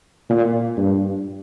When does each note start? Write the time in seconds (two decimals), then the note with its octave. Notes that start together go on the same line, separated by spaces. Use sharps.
0.30 A#2
0.77 G2